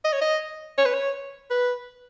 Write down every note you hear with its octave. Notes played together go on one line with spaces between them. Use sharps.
D#5
C#5
D#5
C#5
B4
C#5
B4